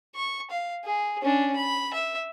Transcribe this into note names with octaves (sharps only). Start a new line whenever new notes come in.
C#6
F5
G#4
C#4 D4
B5
E5